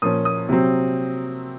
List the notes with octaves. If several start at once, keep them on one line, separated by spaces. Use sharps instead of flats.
A#2 F3 A#3 C#4 D#6
D#6
C3 F#3 C4